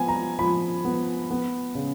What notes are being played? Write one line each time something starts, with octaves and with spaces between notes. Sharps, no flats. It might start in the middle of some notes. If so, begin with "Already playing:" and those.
Already playing: F3 B3 G#5
A#5
F3 B5
B3
B3
C#3